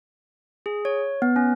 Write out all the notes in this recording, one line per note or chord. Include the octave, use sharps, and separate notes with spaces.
G#4
C#5
B3
C#4